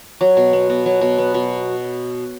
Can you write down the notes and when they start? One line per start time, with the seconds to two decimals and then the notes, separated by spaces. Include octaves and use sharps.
0.21 F#3
0.37 B2
0.53 B3
0.70 B2
0.86 F#3
1.01 B2
1.18 B3
1.34 B2